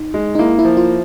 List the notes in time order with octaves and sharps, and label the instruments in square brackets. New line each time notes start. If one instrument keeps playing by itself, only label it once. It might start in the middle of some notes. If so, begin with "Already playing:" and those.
Already playing: [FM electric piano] D#4
[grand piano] G#3
[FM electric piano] D#4
[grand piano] A#3 [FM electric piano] E4
[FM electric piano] E4
[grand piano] F3
[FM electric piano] F4